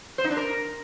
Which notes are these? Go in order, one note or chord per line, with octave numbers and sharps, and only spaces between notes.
C5
D#4
D4
A#4